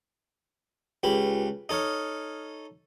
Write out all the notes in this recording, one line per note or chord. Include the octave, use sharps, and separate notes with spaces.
C#2 F4 G4 G#4 B4 B5
D#4 A4 C#5 D#6 F6